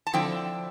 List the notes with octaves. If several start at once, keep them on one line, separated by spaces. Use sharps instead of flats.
A5
D3 F3 C4 E4 G5